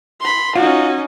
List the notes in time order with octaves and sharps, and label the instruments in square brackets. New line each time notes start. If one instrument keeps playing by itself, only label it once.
[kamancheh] B5 C6
[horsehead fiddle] C#4 D#4 [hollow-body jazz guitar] F4 [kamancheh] F#4